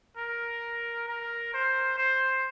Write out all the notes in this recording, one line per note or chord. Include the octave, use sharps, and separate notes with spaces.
A#4
A#4
C5
C5